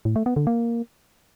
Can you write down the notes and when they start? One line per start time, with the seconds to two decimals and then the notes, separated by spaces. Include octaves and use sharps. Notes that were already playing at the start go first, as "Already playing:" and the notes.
0.05 A2
0.16 A3
0.26 B3
0.36 D3
0.47 A#3